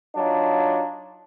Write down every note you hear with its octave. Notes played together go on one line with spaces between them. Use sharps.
F#3 D4 D#4 F4